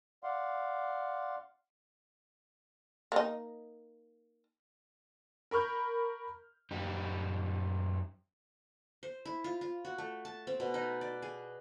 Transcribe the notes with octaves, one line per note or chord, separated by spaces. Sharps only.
D5 F5 F#5 C6
A#3 D#4
A#4 B5 C#6 F6 G6
F#2 D#4 G4
C5
E4
F4
F4
F#4
A3
A5
C4
B2
D#4
D5
G#4